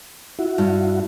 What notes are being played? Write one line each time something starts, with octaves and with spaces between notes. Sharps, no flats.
E4 F#4
G2